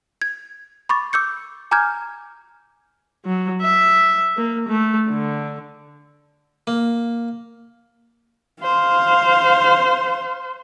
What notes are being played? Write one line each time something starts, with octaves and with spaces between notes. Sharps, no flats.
G#6
B5 C#6 D6 A6
D6 E6 G6 C#7
G#5 A#5 D6 F6 G6 G#6
F#3
E5
A#3
A3
D3
A#3
C5 F5